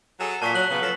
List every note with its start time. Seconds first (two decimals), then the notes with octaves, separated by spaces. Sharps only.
0.20 F#3 G#4 A4
0.42 A#2 A5 C#6 B6
0.54 F#3 F#6 F#7
0.70 C#3 B3
0.82 F3 F#3 A4